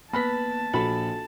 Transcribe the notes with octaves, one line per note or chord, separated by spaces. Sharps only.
A#3 B3 B4 A5 B5 B6
A#1 F#4 A4 B5